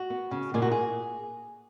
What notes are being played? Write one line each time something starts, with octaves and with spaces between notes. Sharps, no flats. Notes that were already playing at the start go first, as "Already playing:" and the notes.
Already playing: F#4
B3
C#3
A#2 G#4
F#4
G#4